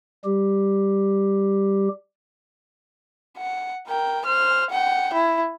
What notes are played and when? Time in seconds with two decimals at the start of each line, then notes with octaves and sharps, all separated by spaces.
0.24 G3 G4
3.37 F#5
3.87 A#4 G5
4.25 C5 F6
4.70 F#5 G5
5.14 E4